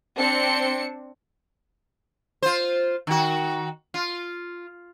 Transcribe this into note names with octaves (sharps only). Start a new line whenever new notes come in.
C4 D4 C#7
F4 C5
D#3 F#4
F4